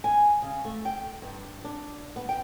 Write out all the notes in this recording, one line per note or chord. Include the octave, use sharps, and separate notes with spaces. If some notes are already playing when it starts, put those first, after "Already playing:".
G#5
C#3
A3
G5
G2
D4
B3
G5